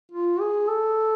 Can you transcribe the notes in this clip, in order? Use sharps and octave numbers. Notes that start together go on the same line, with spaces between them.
F4
G#4
A4